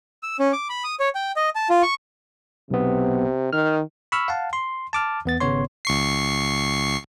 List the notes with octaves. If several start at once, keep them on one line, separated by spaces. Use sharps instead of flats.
E6
C#4
D6
B5
D#6
C#5
G5
D#5
A5
F4
C#6
B1 C3 B3
D#3 F6
B5 C#6 E6 F6
F5 F#5 A5
C6
A5 D6 F6
E2 B3 A6
G#1 C#3 B3 C#5 C6
C#2 C#6 C7